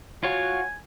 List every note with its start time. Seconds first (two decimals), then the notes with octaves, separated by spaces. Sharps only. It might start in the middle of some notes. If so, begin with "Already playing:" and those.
0.23 F4 F#4 C#5 G#5